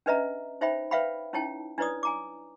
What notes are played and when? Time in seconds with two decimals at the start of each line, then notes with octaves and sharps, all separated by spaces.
0.06 C#4 D4 B4 D#5 E5 A#5
0.61 D#4 C5 C#5 E5 G5 B5
0.91 B4 C#5 E5 F5 G5 B5
1.33 C#4 D#4 E4 C#5 G5 A5
1.78 D4 E4 B4 C#5 D5 D#6
2.03 G#5 A#5 D6